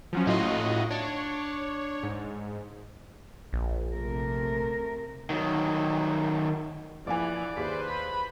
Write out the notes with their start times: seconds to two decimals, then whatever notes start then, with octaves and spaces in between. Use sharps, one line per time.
0.13 F3 F#3 C#4
0.27 A2 D#4 F4 F#4 D#5
0.90 D4 C#5
2.03 G#2
3.53 A#1
3.94 C3 A3 A#4
5.30 D#3 F#3
7.07 A#1 E3 D5 G#5
7.57 D#2 G#4 B4 C5 B6
7.88 B5